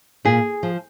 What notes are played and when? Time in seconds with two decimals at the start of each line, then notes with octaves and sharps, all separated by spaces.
0.25 A#2 G#4
0.63 F3